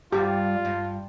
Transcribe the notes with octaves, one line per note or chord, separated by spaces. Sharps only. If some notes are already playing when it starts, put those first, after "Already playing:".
G2 G3 F4 G4
G2